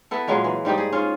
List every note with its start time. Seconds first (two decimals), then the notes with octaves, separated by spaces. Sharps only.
0.11 B3 E4 A4
0.27 A#2 F#3 G#3 A#3
0.44 E3
0.65 G#2 G3 D#4 G4
0.78 G#4
0.92 G#2 C#4 F4